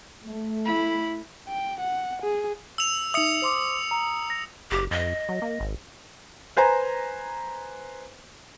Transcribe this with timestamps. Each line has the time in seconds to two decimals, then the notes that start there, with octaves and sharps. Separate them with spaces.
0.25 A3
0.65 E4 B5
1.48 G5
1.81 F#5
2.23 G#4
2.78 E6 F7
3.14 D#4 E5 D#6 C#7
3.42 C5 C6 D6
3.91 A#5
4.30 A#6
4.71 F#1 G4
4.91 F2 D#5
5.29 F#3
5.42 A#3
5.60 G#1
6.57 B4 C5 G#5 A#5